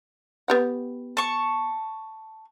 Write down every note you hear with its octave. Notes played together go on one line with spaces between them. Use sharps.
B3 G4 F#5
A5 C#6